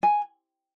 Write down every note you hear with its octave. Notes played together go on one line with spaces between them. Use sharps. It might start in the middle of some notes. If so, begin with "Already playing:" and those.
G#5